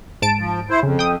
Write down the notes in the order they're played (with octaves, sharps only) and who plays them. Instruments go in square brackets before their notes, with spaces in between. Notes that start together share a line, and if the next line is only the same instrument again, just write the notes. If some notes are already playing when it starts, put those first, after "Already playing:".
[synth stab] G#2 A5 D7
[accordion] F3
E4 C5
[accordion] F2 [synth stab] C#3
[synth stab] G5 D#6